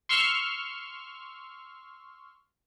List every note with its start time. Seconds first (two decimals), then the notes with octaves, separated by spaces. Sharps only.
0.09 C6 C#6 E6 F6